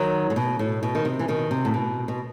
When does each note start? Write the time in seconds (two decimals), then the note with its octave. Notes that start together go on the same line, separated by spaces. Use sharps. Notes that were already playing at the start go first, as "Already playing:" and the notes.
Already playing: D#3 F#3
0.30 A2
0.36 B2
0.59 A2
0.83 B2
0.95 D#3
1.05 C3
1.19 E3
1.28 B2 D#3
1.51 C3
1.65 A2
1.74 B2
2.08 B2